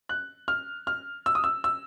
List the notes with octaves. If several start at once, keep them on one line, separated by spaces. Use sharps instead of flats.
F#6
F6
F6
E6
D#6
E6
E6